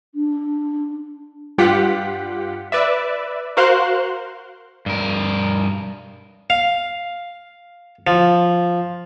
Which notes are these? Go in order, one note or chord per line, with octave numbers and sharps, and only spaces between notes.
D4
G2 F4 G4 F#5 B6
B4 D5 E5
F#4 A#4 C5 F5 C6 F#6
G2 A#4
F5
F3